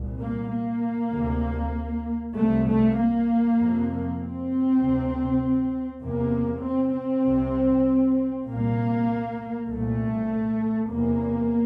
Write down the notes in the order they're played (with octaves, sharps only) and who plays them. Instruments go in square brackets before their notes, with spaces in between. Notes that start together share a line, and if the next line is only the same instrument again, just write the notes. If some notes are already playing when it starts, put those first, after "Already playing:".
Already playing: [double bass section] C2 A#2
A#3
A#3
D2 C3
C2 C3 A3
A3
A#3
F2 C3
C4
D2 C3
E2 C3 A#3
C4
C4
C2 C3
C2 A#2 A#3
C2 A#2 A3
E2 C3 A#3